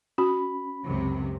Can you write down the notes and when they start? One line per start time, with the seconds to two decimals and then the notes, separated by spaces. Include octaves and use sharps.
0.18 C#4 F#4 B5
0.85 C#2 F#2 C3